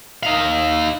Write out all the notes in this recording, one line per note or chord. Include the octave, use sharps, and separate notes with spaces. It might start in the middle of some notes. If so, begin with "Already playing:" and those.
D#4 F5